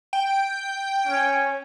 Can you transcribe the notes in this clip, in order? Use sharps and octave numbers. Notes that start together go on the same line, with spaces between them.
G5
C#4